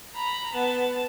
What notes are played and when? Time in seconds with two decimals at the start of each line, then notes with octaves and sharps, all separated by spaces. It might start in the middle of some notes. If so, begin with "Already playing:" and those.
0.14 A#5 B5
0.53 B3 A5